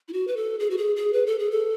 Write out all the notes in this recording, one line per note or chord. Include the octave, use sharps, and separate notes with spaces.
E4
F#4
B4
A4
G#4
F#4
G#4
G#4
B4
A4
G#4
A4